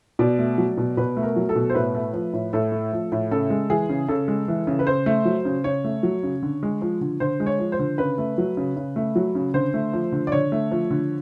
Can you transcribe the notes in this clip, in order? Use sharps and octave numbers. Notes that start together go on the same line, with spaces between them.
B2 D5
A3
F#3
B2
B2 B4
A3
A#4
F#3
A4
B2
C5
A2 B4
A3
F3
A2
A2 A4
A3
F3
A2
C#3 A4
G#3
E3 G#4
C#3
C#3 A4
G#3
E3
C#3
B4
C#3 C5
A3
F#3
C#3
C#3 C#5
A3
F#3
C#3
D3
G#3
F3
D3
D3 C5
G#3
C#5
F3
C5
D3
C#3 B4
A3
F#3
C#3
C#3
A3
F#3
C#3
D3 C5
A3
F3
D3
D5
D3 C#5
A3
F3
D3